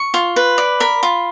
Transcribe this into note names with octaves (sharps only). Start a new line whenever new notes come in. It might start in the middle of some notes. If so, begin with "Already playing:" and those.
Already playing: C#6
F4
B4
D5
A#4 B5
F4